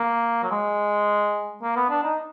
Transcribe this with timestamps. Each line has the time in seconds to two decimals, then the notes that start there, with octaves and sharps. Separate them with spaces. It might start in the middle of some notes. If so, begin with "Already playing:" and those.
Already playing: A#3
0.43 F#3
0.51 G#3
1.62 A#3
1.76 B3
1.90 D4
2.04 D#4